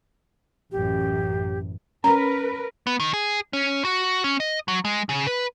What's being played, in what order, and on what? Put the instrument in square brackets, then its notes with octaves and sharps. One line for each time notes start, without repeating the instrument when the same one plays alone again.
[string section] A1 F#2 [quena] G4
[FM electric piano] C#4 [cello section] A#4 B4 [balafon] A#5
[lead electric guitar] B3
D#3
G#4
C#4
F#4
C#4
D#5
F#3
G#3
C#3
B4